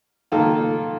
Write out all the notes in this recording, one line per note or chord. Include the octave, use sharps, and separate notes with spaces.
D#3 A#3 F4 A4